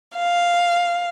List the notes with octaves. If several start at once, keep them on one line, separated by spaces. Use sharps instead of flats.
F5